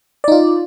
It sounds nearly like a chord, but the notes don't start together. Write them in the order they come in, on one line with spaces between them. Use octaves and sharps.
D5 D#4 F4